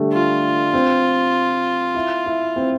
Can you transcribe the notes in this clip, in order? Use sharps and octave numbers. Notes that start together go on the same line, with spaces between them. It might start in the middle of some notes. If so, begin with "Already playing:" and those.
Already playing: D3 G3 A3
F4
C4
E4
E4
C4